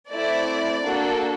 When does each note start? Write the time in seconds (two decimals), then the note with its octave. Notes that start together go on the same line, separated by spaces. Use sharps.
0.12 A3 C4 E4 D5
0.83 A#3 D4 F#4 A4